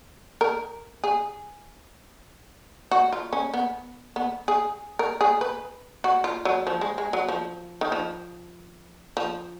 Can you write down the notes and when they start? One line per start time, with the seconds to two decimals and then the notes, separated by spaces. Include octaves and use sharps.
0.41 A#4
1.04 G#4
2.91 F#4
3.12 F4
3.33 C#4
3.54 B3
4.16 B3
4.48 G#4
4.99 A#4
5.21 G#4
5.41 B4
6.04 F#4
6.24 F4
6.45 F#3
6.67 F3
6.81 G#3
6.98 G#3
7.13 F#3
7.28 F3
7.81 D#3
7.92 F3
9.17 F3